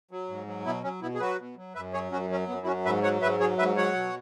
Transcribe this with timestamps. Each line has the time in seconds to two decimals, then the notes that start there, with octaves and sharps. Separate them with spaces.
0.11 F#3
0.29 G#2
0.47 F#3
0.66 B2 B3 E4
0.83 F#3 C#4
1.02 B2 B3 E4
1.15 G#4
1.20 F#3 F#4 B4
1.38 B2
1.57 F#3
1.75 F#2 B4 E5
1.93 F#3 G#4 C#5
2.12 F#2 C#4 F#4
2.30 F#3 C#4
2.48 F#2 B3
2.63 E4
2.66 F#3 C#4 F#4
2.85 G#2 B4 E5
3.03 F#3 C#5 F#5
3.22 G#2 B4 E5
3.40 F#3 G#4 C#5
3.58 G#2 B4 E5
3.76 F#3 C#5 F#5
3.94 B2